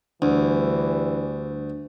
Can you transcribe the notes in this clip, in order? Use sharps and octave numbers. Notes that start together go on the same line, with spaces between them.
D2 E3 G3 D4